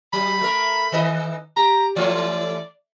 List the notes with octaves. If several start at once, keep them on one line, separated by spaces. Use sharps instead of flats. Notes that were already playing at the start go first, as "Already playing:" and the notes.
F#3 B5
A3 A#4
D#3 D#5
G4 A#5
E3 A3 D5